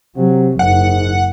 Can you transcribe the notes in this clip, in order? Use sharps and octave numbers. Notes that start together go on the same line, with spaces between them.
C3 F#3
F#1 G#2 F#5